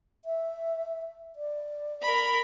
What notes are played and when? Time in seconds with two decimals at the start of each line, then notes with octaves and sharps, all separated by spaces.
0.25 E5
1.36 D5
2.02 A#4 B5